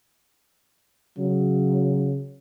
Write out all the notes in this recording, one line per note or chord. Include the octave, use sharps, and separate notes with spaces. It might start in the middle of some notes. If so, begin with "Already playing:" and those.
C#3 F#3